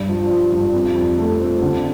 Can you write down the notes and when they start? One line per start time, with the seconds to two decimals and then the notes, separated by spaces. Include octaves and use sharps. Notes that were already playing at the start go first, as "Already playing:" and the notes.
Already playing: G2
0.08 F3
0.30 F3
0.52 G2
0.73 F2
0.95 F2
1.18 A3
1.39 C4
1.62 D3